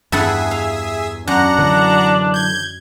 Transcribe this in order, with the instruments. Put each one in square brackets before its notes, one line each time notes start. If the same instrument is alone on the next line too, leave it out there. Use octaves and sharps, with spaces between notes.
[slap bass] E2 [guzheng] G2 A4 F#5 [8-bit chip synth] G#4 E5
[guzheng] F5
[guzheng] F#2 [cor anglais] D4 [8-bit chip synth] F#5 A#5
[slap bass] D3 E3 F#3
[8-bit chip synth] G6 G#6